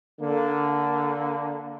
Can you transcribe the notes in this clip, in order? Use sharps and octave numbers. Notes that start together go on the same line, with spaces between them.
D3 A#3